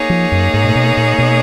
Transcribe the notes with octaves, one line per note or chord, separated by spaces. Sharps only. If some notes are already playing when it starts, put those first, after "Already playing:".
Already playing: A#3 D#4 G#4 C#5
F3
F#2
G#2
A#2
B2
A#2
B2